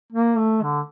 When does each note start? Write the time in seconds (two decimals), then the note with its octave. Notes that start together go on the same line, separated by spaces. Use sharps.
0.12 A#3
0.37 A3
0.63 D3